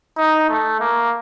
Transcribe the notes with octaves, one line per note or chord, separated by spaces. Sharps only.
D#4
A3
A#3